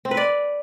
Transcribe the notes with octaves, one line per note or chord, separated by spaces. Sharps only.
C4
B4
D5